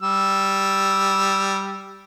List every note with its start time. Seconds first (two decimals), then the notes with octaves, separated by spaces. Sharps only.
0.01 G3 E6